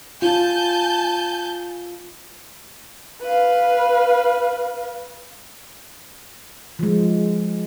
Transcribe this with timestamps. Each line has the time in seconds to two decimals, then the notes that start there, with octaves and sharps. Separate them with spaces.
0.22 F4 G#5 A5 G6
3.22 B4 F5
6.79 F3 G#3